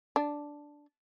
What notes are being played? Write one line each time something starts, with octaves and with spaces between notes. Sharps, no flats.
D4